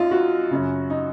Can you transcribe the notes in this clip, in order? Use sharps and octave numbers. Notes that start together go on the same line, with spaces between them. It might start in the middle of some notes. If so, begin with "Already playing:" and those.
Already playing: F#2 D#4 F4
F#4
F#2 C#3
D#4